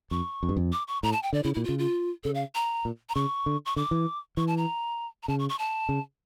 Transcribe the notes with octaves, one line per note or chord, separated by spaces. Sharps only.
F2 C#6
F2
G2
F2
D6
C#6
A2 A#5
A5
G5
D3 D5
C#3 E4
E4
A#2
C#3 F4
F4
C#3 A4
F5
A#5
A#2
A#5
C#3 C#6
D3
C#6
D3 D6
E3
E3 C#6
A5
A#5
A#5
C#3 A5
C#6
C#6
A5
C#3